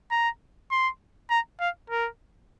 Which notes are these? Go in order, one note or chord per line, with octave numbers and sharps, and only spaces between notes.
A#5
C6
A#5
F5
A#4